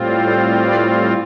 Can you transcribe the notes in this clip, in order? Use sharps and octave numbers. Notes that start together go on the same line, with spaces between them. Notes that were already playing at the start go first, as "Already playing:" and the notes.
Already playing: A2 G3 C4 F4
A4 C5
B4 D5